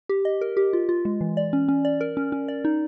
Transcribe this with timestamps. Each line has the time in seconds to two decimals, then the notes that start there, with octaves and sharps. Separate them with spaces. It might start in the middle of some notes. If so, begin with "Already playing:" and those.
0.09 G4
0.25 D#5
0.41 A#4
0.57 G4
0.73 F4
0.89 F4
1.05 G#3
1.21 E3
1.37 D5
1.53 C#4
1.68 C#4
1.85 D5
2.01 A#4
2.17 C#4
2.32 C#4
2.48 D5
2.65 D#4